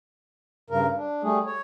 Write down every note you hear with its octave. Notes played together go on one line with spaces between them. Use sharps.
G2 C#3 A#4
D4
G3 A3 G#4
C#5